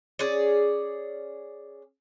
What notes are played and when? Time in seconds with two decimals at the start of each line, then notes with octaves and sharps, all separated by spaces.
0.19 C#4 G#4 D5